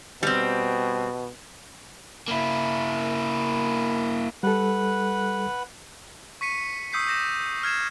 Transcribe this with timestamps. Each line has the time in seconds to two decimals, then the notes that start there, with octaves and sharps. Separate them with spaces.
0.23 B2 G3 C4
2.28 A#3 E4
4.43 G3 A4 B4 F#5
6.41 C#6 B6 C#7 D#7
6.93 C#6 D#6 E6 G6 B6 C7
7.07 D6 G6 A#6 E7
7.63 F6 G#6 C7 E7